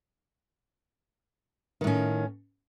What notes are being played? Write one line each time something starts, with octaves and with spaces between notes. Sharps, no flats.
A2 D#3 C#4